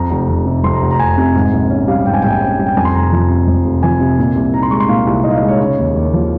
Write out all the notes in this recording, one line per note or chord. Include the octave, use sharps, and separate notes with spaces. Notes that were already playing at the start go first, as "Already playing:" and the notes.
Already playing: F2 A#5
F1
F1
C3
F2 C6
A#5
F1
A#5
F1 G#5
C3
G#2
A#1
C#4
G3 F5
G#2 G5
G#5
A#1 G5
G#5
C#4 G5
G3
G5
F2 G#5
C6
F1 A#5
F3
C3
F2
F1
F3 G#5
C3
A#2
C2
D#4 A#5
C6
G#3 C#6
C6
A#2 F5
C2
D#4 D#5
F5
D#5
G#3
C#5
C#3 C#5
D#2
D#2
F3